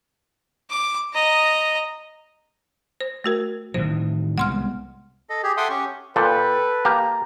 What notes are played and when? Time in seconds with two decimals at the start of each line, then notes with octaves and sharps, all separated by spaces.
0.70 D6
1.14 D#5 A#5
3.01 C5
3.24 A3 F#4 A#4
3.74 A2 D#3 E3 C5
4.38 C2 G#3 B3 F#5 C6 F6
5.30 A4 D#5
5.43 G4 G#4
5.57 A4 E5 F#5 G5 C6 D#6
5.70 C#4 G4 C#6
6.16 A#2 A4 B4 G5
6.85 A#3 G4 A#5